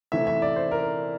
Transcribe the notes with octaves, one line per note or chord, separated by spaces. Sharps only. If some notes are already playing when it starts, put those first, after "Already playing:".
C3 E3 A3 E4 E5
E5
D5
C5
A#4